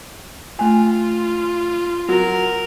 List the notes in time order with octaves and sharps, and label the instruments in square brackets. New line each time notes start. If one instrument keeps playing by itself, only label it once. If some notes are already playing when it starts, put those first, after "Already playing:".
[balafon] A3 G#5 [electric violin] F4
[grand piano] F#3 [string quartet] A#4